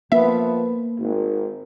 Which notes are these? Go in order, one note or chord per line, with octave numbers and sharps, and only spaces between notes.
F3 A#3 B3 E5
G#1